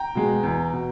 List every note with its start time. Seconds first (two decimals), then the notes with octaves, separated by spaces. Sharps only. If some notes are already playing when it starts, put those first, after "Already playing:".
Already playing: G5 A#5
0.15 B2 G#3
0.43 E2
0.73 B2